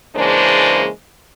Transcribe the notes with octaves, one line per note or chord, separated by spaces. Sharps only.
C#3 E3 G#3 A#3 D4 C5